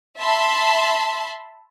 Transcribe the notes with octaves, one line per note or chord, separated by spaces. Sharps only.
E5 A5 B5 C6